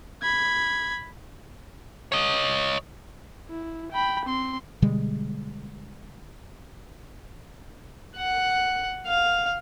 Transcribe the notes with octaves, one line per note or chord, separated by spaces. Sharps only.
B5 G#6
C#5 D#5
E4
G5 B5
C4 C6
B2 D3 G3 G#3
F#5
F5